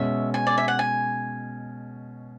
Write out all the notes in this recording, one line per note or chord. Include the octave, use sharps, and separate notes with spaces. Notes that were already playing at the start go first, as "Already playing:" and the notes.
Already playing: B2 G#3 C#4 E5
G#5
D5
E5
F#5
G#5